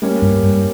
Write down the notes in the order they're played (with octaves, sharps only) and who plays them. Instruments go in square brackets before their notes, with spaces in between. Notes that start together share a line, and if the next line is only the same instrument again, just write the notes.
[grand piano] G3 A#3 C#4
[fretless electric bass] G2
G2